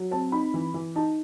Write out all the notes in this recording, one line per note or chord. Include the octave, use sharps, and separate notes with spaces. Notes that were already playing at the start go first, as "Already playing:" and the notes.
Already playing: F#3
C4 A5
D#4 B5
E3
E3
D#4 A5